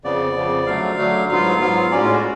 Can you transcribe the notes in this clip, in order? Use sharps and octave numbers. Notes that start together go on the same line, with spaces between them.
F2 C#3 F3 B3 D5
F2 C#3 F3 B3
D3 F#3 A3 F5
D3 F#3 A3
G#2 F#3 B3 F4 F5
G#2 F#3 B3 F4
A2 G#3 C#4 D5
F4
F#4